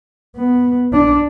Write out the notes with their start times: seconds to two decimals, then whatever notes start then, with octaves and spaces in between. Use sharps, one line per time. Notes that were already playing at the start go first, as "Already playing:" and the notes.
0.37 B3
0.93 D4